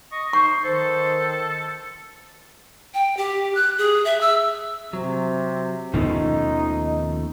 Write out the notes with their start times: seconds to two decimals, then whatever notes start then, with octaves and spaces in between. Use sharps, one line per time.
0.12 D#5 C#6
0.33 D#4 C5 C#6
0.64 D#3 A4 C5
2.94 G5
3.17 G4
3.55 F#6
3.78 G#4
4.05 E5
4.21 E6
4.93 C3 F#3
5.94 D#2 B2 D#3 F3 A3 C#4 D#4